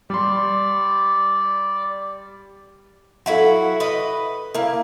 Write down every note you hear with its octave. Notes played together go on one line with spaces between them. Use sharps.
G3 D5 C6
F#3 E4 F#4 A4 F5 F#5
B4 D#5
A#3 E4 A#4 F5